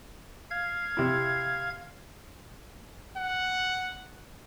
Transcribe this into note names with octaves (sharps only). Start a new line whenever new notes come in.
F5 G#6
C3 E4
F#5